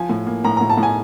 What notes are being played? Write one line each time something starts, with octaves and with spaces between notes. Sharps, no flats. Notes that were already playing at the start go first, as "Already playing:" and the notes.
Already playing: F3 G#5
A2
A#3
A2 A#5
A2 A#5
A5
A2
G#5